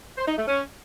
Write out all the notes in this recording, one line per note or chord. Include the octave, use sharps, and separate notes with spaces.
C5
D#4
A3
C#4